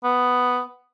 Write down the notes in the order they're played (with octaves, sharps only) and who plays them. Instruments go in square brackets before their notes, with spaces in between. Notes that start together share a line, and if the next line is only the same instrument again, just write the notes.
[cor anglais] B3